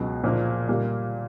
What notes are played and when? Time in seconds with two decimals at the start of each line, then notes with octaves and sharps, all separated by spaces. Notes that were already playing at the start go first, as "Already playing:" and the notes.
Already playing: C#2 B2 F#3
0.24 A#2 F3 A#3 D4
0.68 A#2 G3 A#3